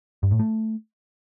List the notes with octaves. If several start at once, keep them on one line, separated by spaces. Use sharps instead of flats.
G2
A2
A3